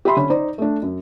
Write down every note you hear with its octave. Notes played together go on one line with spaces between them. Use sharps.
G4 E5 B5 C6
D3 C#4 B5
D#4 C5 D5
A3 D4
F#2